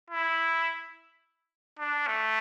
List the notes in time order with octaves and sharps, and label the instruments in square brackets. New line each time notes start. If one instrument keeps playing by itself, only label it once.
[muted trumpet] E4
D4
A3